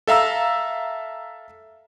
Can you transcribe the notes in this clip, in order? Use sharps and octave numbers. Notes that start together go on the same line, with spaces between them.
A4 E5 F5 A#5 E6